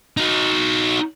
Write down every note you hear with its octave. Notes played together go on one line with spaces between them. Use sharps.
D#4 F#4